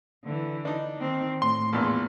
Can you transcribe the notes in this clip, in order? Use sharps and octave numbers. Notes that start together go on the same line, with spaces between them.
D3 E3
D4 D#4
D#3 C4
A2 C6
A#1 E2 A#2 B3